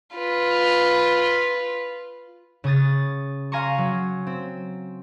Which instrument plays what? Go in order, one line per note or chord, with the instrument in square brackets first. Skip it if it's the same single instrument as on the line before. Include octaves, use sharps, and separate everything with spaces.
[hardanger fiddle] F4 B4
[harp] C#3 C#6 D#6 A6
F5 G#5 A#5 C6 C#6
F#3
C4